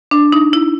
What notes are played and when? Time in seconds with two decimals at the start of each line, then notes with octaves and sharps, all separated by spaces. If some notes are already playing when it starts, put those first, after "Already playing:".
0.11 D4
0.32 D#4
0.53 E4